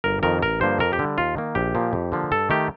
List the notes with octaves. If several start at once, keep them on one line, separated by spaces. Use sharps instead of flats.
G1 A#4
F2 D#3 A#4
A1 A#4
G2 D3 F3 A#3 C5
F2 A#4
G4
D3 G3
D#2 F4
D#3 A#3
A#1 G4
A#2 F3 A#3
F2
D3 F3 A#3
G2 A4
D#3 A3 G4